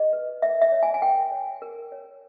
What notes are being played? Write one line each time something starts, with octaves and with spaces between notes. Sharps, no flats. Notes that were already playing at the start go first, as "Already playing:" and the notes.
Already playing: G#4 D#5
B4
A#4 E5
E5
C#5
G#5
G#5
A#4 G5
C#5
A#4
C#5